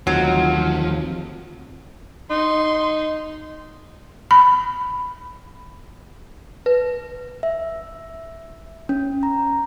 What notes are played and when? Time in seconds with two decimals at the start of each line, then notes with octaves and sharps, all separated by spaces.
0.07 F1 D#2 D3 F3 F#3
2.30 D#4 C6
4.31 B5
6.66 B4
7.43 E5
8.89 C#4
9.23 A#5